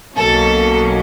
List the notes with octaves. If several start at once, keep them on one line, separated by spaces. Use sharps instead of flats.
B1 B2 F#3 A#3 C#4 A4